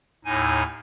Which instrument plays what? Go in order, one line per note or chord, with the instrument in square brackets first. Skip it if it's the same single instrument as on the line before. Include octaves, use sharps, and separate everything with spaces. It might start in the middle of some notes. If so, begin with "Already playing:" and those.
[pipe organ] D#2 A2 D#4 G#5